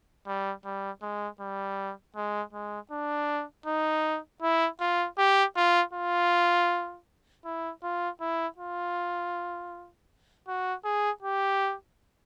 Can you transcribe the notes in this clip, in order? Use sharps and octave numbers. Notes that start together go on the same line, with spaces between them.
G3
G3
G#3
G3
G#3
G#3
D4
D#4
E4
F4
G4
F4
F4
E4
F4
E4
F4
F#4
G#4
G4